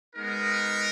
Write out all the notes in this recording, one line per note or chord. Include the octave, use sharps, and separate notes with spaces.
G#3 B3 D#4 A#4